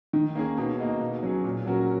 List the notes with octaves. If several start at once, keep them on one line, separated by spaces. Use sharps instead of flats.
D#3
A#3 C#4 G#4
B2
A#3 D#4 F#4
B2
F#3 C#4 G#4
A#2
F#3 C#4 F#4 A#4